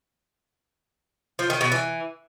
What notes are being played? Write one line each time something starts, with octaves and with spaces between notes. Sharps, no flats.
F3
D#3
B2
E3